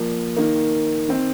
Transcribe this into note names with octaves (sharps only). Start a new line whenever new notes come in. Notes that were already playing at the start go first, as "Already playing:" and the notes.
Already playing: A#2 F3 A#3
D#3 A#3
D#3 C4